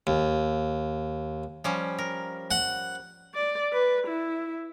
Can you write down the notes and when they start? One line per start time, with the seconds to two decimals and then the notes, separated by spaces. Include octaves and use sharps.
0.07 D#2
1.64 F3 G3 C#4
1.99 A#4
2.51 F#5
3.34 D5
3.73 B4
4.07 E4